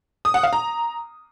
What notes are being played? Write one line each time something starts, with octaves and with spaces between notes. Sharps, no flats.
D#6
F#5
F5
A#5